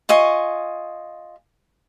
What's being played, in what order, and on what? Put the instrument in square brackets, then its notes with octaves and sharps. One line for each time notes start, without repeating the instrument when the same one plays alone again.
[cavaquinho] F4 D#5 G#5 C#6